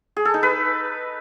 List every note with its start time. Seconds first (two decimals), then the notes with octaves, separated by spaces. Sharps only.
0.17 G#4
0.25 A4
0.34 D#4
0.43 B4